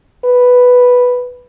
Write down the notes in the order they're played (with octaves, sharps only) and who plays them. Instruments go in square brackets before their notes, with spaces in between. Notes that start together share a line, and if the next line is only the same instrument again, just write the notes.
[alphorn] B4